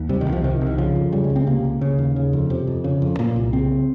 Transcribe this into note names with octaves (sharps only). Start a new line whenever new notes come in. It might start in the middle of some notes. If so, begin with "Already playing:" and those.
Already playing: D#2
C3 G3
D#3
C2
F3
C3 D#3
C2
D#3
C#3 F3
F2
C#3 G3
G#3
C#2
C4
C3 A#3
C#2
C#3
D#2
C#3
F2
C3
F2
C#3
F2
A#2 A#3
C2
C#3 C4